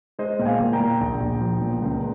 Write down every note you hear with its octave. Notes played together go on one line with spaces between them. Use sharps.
G#3 C5 D#5
A#2 G5
F5 G#5
A#2
G5 A#5
A#2
A#1
A#1
F3
A#2
C#2